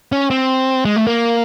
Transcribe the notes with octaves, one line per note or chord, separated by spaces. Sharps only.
C#4
C4
G#3
A3
A#3